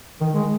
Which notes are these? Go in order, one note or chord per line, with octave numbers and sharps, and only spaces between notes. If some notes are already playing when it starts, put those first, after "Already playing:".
D#3
G#3